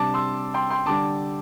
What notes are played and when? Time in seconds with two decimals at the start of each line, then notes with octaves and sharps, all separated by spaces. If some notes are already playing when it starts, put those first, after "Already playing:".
Already playing: C3 G3 D4 A5 D6
0.14 C6 E6
0.54 G5 C6
0.70 G5 C6
0.86 D3 G3 D4 A5 D6